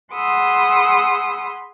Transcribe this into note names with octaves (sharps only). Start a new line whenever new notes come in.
G#4 F#5 B5 C6 D#6 E6